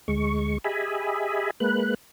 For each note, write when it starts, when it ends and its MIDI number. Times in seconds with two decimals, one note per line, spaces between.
0.08 0.58 38
0.08 0.58 56
0.08 0.58 85
0.64 1.51 67
0.64 1.51 68
0.64 1.51 75
0.64 1.51 76
0.64 1.51 80
0.64 1.51 83
1.60 1.94 56
1.60 1.94 58
1.60 1.94 71
1.60 1.94 90